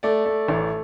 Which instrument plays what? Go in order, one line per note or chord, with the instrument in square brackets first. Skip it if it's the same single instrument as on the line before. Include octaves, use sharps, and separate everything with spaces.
[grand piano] A3 D5
A3
A1